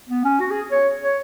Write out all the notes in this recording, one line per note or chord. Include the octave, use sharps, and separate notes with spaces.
B3
C#4
F#4
G#4
C#5
C#5